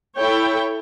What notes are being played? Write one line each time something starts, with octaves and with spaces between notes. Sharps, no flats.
E4 A4 C#5 G5